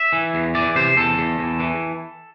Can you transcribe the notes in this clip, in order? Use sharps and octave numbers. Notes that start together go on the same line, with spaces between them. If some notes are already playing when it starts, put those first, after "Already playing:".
Already playing: E5
E3
E2
E3 D5
C3 C5
E2 A4
E2
E2
E3